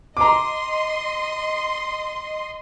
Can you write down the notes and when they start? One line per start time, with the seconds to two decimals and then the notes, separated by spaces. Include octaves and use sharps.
0.17 D#5 A#5 C6 D6